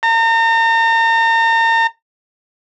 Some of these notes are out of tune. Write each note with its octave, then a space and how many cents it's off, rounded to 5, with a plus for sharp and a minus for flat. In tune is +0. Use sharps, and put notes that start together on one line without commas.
A#5 -40